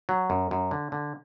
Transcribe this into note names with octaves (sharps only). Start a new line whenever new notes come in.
F#3
F#2
F#2
D3
D3